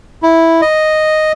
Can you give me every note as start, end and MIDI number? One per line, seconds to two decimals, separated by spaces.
0.23 0.61 64
0.62 1.32 75